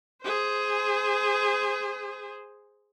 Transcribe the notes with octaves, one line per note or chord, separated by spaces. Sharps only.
G#4 C5